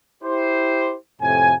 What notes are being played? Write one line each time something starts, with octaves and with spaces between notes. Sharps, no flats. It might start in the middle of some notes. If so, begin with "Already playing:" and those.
E4 G4 C5
F2 A2 C3 G#5